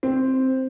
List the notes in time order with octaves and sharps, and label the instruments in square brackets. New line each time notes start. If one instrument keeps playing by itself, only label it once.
[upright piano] C4